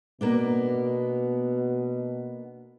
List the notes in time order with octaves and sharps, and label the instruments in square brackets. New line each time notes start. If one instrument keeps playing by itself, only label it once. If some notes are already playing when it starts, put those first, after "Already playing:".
[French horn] B2 [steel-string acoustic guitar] A#3 B3 D4